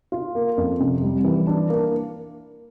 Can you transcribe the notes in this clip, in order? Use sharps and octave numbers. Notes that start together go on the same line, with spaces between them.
F4
A#3
F2
C3
G3
E3
D4
A#3